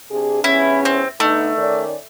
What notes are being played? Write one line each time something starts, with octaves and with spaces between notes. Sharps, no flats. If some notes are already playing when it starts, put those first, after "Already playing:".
C3 D4 G#4
E2 G2 C#4 E4
C4
D3 A3 B3 D#4
D#3 C#4 D5